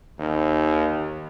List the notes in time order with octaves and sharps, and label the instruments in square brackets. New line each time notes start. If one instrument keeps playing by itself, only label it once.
[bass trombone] D#2